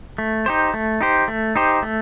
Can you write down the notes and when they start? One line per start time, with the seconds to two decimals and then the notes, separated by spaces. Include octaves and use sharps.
0.18 A3
0.46 D#4 G4 C5
0.74 A3
1.01 D#4 G4 C5
1.28 A3
1.56 D#4 G4 C5
1.82 A3